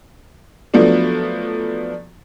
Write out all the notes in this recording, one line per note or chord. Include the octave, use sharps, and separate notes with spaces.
F3 F#3 A3 B3 D4